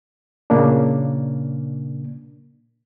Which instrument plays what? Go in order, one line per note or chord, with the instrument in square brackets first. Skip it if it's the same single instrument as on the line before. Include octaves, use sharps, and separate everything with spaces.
[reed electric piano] A#2 C#3 A#3 D4